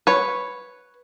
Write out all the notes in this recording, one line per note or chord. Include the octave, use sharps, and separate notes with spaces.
B4 C#5